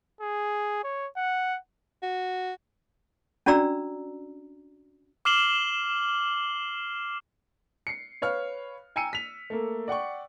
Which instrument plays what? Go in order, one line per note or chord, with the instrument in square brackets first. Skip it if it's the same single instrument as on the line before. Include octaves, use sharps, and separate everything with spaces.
[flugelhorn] G#4
C#5
F#5
[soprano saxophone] F#4
[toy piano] C#4 D4 F#4 D5 A#5 E6
[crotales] D6 F6 C7 E7 F#7 G7
[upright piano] C7 C#7
B4 C#5 F5 F6
G5 G#5 A#5 E6 C#7 D#7
B6 F7
A3 A#3
D5 F#5 G5 C#6